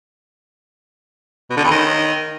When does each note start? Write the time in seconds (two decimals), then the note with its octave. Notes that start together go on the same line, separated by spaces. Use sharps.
1.50 B2
1.57 D3
1.64 E2
1.71 D#3